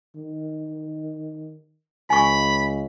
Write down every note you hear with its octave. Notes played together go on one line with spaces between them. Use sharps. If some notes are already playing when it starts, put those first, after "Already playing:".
D#3
C#2 G#5 B5 C#6